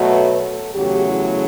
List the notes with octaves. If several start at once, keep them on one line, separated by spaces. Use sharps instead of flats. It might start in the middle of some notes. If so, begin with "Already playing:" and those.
Already playing: B2 F#3 A3
B4
A4
E2 C#3 F#3 A3 G4
E4